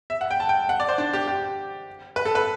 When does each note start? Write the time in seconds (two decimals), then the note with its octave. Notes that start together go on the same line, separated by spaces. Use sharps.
0.10 E5
0.21 F#5
0.31 G5
0.40 A5
0.49 G5
0.69 F#5
0.80 D5
0.89 C5
0.98 D4
1.13 G4
1.27 G4
2.16 B4
2.25 A4
2.35 B4